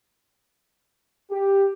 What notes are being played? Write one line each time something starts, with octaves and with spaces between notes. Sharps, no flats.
G4